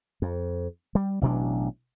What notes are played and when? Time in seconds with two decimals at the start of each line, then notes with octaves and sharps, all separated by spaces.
0.22 F2
0.95 G3
1.21 A1 B2 F#3 D4